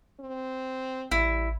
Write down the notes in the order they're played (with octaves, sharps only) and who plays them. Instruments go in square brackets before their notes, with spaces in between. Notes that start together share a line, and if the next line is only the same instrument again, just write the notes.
[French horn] C4
[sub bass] A1 [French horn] G3 [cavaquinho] E4